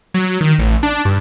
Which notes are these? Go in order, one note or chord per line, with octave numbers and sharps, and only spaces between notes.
F#3
D#3
A1
D4
G2